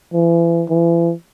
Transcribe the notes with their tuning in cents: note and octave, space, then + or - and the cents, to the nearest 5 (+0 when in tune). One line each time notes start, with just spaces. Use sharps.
E3 +35
E3 +40